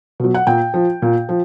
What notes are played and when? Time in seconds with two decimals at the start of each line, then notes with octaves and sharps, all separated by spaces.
0.20 B2 F#3
0.34 F#5
0.47 A#2 G5
0.74 F3
1.02 A#2
1.29 F3